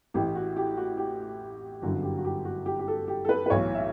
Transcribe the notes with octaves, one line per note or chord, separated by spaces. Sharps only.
A1 A2 E3 G4
F#4
G4
F#4
G4
G1 F#2 D3 F#4
G4
F#4
G4
F#4
G4
G4
A4
G4
A4
B4
B4
B1 A2 E3 C#5
E5